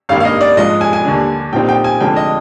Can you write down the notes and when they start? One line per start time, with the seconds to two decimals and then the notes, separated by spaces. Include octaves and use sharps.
0.09 G#1 G2 D#3 A#3 F5
0.20 F5
0.25 D#5
0.41 D5
0.57 G#2 F3 G#3 D#5
0.81 G#5
0.93 G#5
1.05 D#2 D3 G3 D4
1.52 A#1 A#2 G3 C4 D#4 G5
1.69 G5
1.84 G#5
2.00 F1 F2 D3 G#3 G5
2.16 D#5